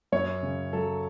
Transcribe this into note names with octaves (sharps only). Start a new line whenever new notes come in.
F#2 C#5
C#3
F#3 A4